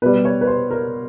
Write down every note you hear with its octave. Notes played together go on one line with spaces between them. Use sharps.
B2 G3 B4
C#5
B4
C5
A#4